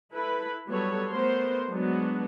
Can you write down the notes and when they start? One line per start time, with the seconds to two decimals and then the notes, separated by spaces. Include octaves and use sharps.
0.13 E4 A4 B4 B5
0.67 F#3 G3 B3 A4 C#5
1.10 A3 B3 A#4 C5 C6
1.70 F#3 G#3 B3 D4 F#4